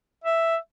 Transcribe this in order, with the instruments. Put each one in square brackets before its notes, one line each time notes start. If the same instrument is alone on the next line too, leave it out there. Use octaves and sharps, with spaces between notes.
[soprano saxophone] E5